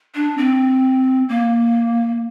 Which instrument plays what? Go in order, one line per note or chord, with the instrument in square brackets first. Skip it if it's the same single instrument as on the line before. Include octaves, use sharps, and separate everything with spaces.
[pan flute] D4
C4
A#3